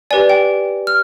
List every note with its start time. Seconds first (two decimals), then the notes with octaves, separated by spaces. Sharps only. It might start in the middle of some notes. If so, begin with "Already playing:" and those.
0.11 G4 B4 D5 G#5
0.29 G5
0.87 F6